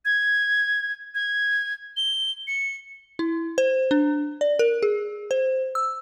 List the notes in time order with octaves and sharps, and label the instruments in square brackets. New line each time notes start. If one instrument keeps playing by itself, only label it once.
[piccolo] G#6
G#6
G7
C#7
[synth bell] E4
C5
D4
D5
A#4
G#4
C5
E6